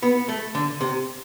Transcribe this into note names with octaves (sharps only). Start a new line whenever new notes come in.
B3
A3
D3
C3